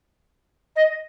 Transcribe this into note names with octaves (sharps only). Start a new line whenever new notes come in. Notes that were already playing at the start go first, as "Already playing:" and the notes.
D#5